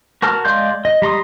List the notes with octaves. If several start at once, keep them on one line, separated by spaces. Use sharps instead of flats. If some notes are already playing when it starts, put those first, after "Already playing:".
F#4 A#4 A5 F6
G#3 D5 F5 C6 G6
D#5
G3 A#5 C6 D#6